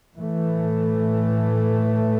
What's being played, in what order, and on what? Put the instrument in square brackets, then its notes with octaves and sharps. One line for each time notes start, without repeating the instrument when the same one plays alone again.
[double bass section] A2 E3 A3